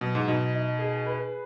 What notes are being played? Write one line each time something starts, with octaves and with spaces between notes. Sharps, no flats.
B2 F#3
G#2
B2 D#4
D#4
G#4
B4